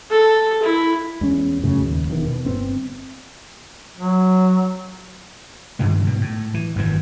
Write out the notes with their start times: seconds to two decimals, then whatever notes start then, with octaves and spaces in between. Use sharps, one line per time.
0.10 A4
0.62 E4
1.21 E2 G#3 C#4
1.63 F#2 A2 C#3 F#3
1.82 D#2
2.08 E1 E2 D#3
2.27 B2
2.45 G1 B3 C4
3.98 F#3
5.79 G2 D3 D#3 G#3
6.05 G#2 B2
6.21 A2
6.54 E3
6.76 G#1 F#2 A2 E3